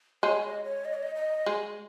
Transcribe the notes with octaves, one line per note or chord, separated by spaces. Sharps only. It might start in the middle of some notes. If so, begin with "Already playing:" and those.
G#3 C#5
D#5
C#5
D#5
C#5
D#5
D#5
G#3